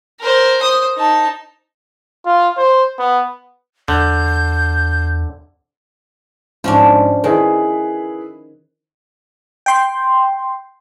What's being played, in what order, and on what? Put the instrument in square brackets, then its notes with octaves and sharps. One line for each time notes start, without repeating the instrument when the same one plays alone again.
[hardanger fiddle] A#4 C5
C5 D#6
D#4 A5
[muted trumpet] F4
C5
B3
[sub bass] E2 [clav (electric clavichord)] D3 [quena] G6
[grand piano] G#2 [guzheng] F3 C#4 D4
[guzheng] D#3 [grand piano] E4 G#4 B4
[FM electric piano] G5 C6